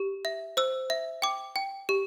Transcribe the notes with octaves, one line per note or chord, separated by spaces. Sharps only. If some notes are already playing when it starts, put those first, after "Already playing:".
Already playing: G4
E5
C5 E6
E5
G5 D6
G5
G4